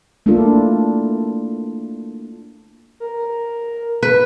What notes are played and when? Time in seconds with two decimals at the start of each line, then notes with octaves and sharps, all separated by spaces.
0.26 A3 A#3 D4 E4 F4 A4
3.00 A#4
3.20 A#4
4.03 B4